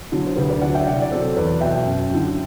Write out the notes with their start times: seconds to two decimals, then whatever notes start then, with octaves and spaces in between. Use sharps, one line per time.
0.12 D3 F#3
0.27 C5
0.36 D2 G4 B4
0.50 B4 D5
0.62 D3 F#3 D5 F#5
0.74 E5 G5
0.86 C2 D5 F#5
1.02 D5
1.11 C3 F#3 A4 C5
1.37 E2 B4 D5
1.61 B2 F#3 E5 G5
1.86 F#2
2.11 D3 F#3